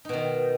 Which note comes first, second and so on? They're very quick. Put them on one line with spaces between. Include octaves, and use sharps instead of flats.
D#4 B2 D#3